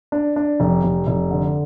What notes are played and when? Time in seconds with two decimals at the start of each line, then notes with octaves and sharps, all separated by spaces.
0.12 D4
0.36 D4
0.60 F1
0.84 F1
1.07 F1
1.31 D3